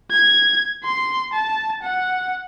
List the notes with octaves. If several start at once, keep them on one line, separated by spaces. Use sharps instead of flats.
G#6
C6
A5
F#5